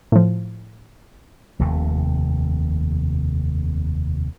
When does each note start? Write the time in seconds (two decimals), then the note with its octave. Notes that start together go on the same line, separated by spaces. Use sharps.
0.12 A2 F3
1.59 F1 D#2 C3 A3